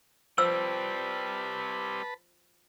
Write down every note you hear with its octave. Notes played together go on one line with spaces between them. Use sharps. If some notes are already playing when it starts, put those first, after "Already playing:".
F3 G3 C4 B4 A5 B5 E6